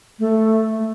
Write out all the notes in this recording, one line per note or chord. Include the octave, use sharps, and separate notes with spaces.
A3